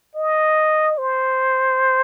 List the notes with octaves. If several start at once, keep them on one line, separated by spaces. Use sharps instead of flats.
D#5
C5